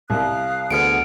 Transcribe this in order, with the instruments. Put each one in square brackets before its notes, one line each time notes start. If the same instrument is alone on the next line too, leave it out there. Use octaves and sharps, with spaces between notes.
[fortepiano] C2 [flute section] F5 D#6 F#6
[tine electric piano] D2 D3 B3 [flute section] G#4 [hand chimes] F6 C#7 D7